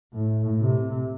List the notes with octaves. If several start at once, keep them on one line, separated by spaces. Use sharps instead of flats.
A2
C3